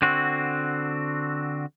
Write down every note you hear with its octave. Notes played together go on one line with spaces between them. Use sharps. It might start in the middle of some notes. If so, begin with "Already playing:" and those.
D3 C4 F#4